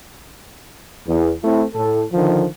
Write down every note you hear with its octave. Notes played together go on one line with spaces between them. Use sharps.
E2
A3 C4 E4
A2 A4
D3 D#3 F3